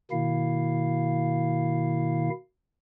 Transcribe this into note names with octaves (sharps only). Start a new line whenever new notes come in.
B2 D#3 A#3 E4 F5